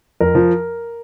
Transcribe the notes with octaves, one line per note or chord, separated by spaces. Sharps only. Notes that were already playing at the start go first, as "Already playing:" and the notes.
F2 A#4
F3